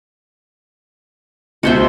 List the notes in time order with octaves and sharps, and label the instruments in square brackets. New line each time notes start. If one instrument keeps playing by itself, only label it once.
[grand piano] C#2 B2 [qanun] F#4 C5 E5